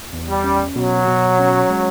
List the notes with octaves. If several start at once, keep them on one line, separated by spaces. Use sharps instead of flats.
E2
G3
C#4
B2 F#3
B2
C#4
G#3